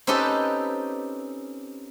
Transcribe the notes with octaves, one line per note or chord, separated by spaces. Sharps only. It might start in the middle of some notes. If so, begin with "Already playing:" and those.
C4 C#4 D#4 G4 A4 B4